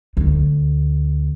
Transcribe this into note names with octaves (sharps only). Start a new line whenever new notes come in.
D2